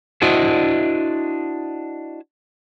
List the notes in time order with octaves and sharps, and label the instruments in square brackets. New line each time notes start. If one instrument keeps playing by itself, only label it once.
[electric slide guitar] D4 E4 F#4 C5 D#5